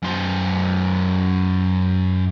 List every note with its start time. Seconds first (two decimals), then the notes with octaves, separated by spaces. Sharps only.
0.02 F#2 C5